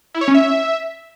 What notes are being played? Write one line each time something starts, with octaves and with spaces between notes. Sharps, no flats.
E4
C#5
C#4
E5